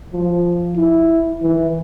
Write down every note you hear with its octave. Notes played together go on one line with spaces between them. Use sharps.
F3
E4
E3